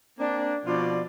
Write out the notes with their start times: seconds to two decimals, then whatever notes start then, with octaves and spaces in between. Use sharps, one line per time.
0.19 A#3 C4 D4
0.66 B2 F3 D4 F4 D5